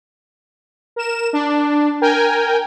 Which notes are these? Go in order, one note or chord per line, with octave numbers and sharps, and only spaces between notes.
A#4 E7
D4
A#4 G5 G#5